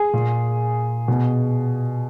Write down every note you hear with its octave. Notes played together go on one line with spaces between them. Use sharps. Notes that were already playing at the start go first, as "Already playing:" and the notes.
Already playing: G#4
A#2
B2